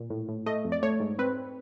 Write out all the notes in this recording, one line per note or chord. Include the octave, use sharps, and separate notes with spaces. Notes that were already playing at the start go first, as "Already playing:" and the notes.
Already playing: A#2
A2
A2
A3 D#5
F2
D5
A3 C#5
G#2
C4 B4